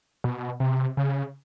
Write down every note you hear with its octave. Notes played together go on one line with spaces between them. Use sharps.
B2
C3
C#3